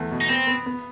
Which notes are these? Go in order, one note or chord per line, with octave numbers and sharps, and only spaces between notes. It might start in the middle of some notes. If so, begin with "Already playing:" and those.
Already playing: E2 A3
B2
D#4
B3 C4
B3
B3